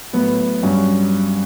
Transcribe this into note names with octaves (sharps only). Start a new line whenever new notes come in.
A2 F#3 B3
G2 F#3 C#4 F#4